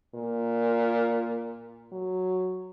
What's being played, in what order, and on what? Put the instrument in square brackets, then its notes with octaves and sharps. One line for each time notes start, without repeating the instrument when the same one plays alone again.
[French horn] A#2
F#3